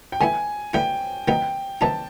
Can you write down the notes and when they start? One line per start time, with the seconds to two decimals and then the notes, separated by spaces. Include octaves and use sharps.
0.12 G5
0.21 D3 G3 B3 E4 G#5
0.73 D3 G3 B3 E4 G5
1.28 C3 D#3 F#3 B3 D#4 G5
1.81 C3 D#3 F#3 B3 D#4 A5